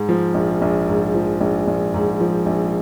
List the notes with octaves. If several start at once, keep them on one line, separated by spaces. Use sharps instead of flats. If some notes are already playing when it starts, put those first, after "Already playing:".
Already playing: G#2
F3
A#1
A#1
G#2
F3
A#1
A#1
G#2
F3
A#1